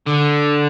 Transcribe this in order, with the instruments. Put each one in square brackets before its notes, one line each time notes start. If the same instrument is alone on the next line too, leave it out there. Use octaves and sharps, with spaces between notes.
[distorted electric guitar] D3